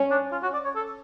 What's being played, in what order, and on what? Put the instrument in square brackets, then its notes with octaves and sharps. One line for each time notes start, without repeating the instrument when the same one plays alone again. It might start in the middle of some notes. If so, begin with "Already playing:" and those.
Already playing: [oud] C#4
[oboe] D4
F4
F#4
D5
C#5
A4